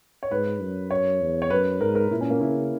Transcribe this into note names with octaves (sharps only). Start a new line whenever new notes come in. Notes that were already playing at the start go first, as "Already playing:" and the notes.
C#5
G#2 B4
F#2
C#5
E2
C#5
F#2 B4
G#2 A#4
A#4
A#2 E4
C#4
A#3
C#3 E4